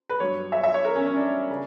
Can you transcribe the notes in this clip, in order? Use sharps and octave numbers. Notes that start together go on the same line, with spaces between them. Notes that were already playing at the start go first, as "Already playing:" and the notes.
B4
G2 F#3 C#5
E5
E5
C#5
A#4
C#4
C#4
D4
C#3